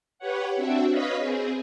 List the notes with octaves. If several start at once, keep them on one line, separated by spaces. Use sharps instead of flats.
G4 B4 C#5 F#5
C4 D4 F#4 E5
B4 C#5 D#5 F5 B5
C4 G#4